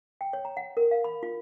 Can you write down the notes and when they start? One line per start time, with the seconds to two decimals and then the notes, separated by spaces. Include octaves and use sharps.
0.21 G5
0.33 C#5
0.45 A#5
0.57 F#5
0.77 A#4
0.91 F5
1.04 B5
1.23 F4